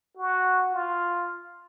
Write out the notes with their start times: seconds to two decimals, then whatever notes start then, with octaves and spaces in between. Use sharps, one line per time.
0.17 F#4
0.73 F4